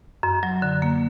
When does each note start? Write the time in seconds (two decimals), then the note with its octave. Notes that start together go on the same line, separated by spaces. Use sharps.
0.23 F#2
0.43 F#3
0.62 D3
0.82 A#3